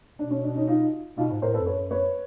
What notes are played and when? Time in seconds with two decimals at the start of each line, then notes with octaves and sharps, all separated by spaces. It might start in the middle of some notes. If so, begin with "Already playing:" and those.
0.19 B2 D4
0.31 C#4
0.44 D4
0.55 C#4 D#4
0.67 D#4 F4
1.17 B2 D#4 F4
1.31 G#2
1.42 A2 A#4 C5
1.54 A4 B4
1.60 F2
1.66 F#2 B4 C#5
1.91 B4 C#5